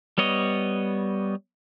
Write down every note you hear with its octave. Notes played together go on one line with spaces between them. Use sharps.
G3 B3 C#5 D#5